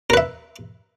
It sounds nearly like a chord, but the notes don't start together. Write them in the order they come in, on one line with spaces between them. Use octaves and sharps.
A#4 B4 E5